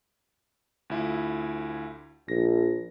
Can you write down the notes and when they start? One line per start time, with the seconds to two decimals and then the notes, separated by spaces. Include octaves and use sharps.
0.90 D2 E4 F4
2.28 A#1 A#6